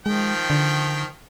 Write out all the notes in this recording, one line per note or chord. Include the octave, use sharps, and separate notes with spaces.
D#3 F3 G#3 G5
D3